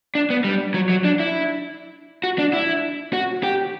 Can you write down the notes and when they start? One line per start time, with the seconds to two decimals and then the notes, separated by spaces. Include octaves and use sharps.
0.15 D4
0.30 B3
0.44 G3
0.74 F#3
0.89 F#3
1.04 D4
1.20 E4
2.24 F#4
2.39 D4
2.53 E4
3.13 F#4
3.43 G4